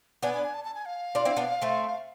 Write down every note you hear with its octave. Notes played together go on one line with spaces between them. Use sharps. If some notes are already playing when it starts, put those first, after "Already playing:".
B3 D4 G#5
G#5
G#5
A5
A5
G#5
F5
D4 F4
C4 E4
B3 D4
A3 C4